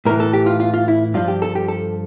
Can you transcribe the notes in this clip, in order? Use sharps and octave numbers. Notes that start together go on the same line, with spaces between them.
A2 E3 A#4
A4
G4
F4
F4
F4
E4
G2 F3 F4
G4
A4
G4
A4